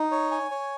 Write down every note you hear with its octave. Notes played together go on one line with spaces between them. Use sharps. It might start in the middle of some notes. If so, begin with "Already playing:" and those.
Already playing: D#4
C#5
G#5
C#5